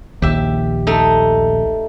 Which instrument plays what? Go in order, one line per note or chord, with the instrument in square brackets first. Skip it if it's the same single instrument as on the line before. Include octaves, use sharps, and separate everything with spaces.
[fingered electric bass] A#1 D#2 [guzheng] G4 E5
[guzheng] A3 D#4